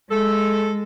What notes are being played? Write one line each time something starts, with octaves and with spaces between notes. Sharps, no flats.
G#3 A4